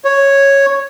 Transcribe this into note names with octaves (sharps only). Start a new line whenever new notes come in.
C#5